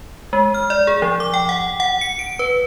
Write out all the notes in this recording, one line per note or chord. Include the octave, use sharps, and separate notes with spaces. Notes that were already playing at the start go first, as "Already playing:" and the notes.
G#3
F6
D5
G#4
F3
D6
G5
F#5
F#5
C#7
D7
B4